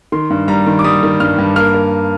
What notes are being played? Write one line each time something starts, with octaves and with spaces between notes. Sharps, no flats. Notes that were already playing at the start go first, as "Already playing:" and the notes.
D#3 C6
G2
G3 A#5
D#3
D6
G3 D#6
D#3
G2 F6
G2
A#3 F6
A#3